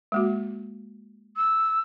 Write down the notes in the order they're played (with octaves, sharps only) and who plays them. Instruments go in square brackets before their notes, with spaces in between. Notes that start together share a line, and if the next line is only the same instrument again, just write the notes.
[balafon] G#3 A#3 F#4
[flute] E6